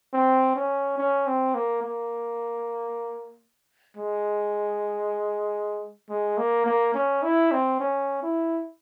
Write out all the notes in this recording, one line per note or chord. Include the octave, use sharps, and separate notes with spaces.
C4
C#4
C#4
C4
A#3
A#3
G#3
G#3
A#3
A#3
C#4
E4
C4
C#4
E4